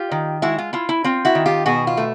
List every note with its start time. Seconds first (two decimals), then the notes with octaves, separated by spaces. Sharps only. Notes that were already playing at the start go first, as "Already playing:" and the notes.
Already playing: F4 G4
0.12 D#3
0.42 G#3 E4 F#4
0.58 F4
0.73 E4 F4
0.89 E4
1.04 C4 F4
1.25 E4 F#4
1.35 D#3
1.46 F4 G4
1.66 B2 F#4 G#4
1.87 F4
1.97 A3